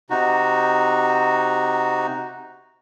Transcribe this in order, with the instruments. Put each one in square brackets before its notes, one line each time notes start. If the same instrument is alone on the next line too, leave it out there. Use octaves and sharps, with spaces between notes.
[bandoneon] C3 D#4 F#4